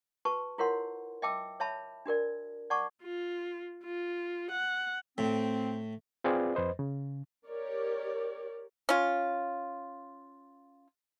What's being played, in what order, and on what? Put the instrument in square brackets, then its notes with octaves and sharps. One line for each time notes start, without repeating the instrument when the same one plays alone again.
[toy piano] F#4 B4 A5 C#6
E4 F4 A#4 C#5 F#5 C6
D#5 E5 G5 A5 D6 E6
C#5 E5 A5 B5
D4 F#4 A#4 D5
D5 F#5 A5 C#6 D6
[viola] F4
F4
F#5
[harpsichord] A2 [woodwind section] C4
[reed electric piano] C4 F4 G#4 B4 D5
F2 B4 C5 D#5
C#3
[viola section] G4 A#4 C#5 D5
[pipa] C#4 F4